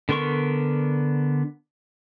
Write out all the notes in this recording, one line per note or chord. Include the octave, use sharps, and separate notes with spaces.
D3 B3 A#4 C6 C#6